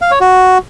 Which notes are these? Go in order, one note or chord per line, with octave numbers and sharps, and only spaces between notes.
F5
C#5
F#4